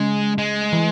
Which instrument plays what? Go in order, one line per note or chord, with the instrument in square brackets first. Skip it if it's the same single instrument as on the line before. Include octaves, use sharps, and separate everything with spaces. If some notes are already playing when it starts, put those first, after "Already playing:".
Already playing: [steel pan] C#3 [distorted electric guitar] G#3
[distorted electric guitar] G#3
[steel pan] E3